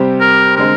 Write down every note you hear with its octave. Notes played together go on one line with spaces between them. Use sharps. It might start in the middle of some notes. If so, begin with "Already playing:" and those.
Already playing: C3 G3 C4 G4
A#4
D3 G#3 C4 A#4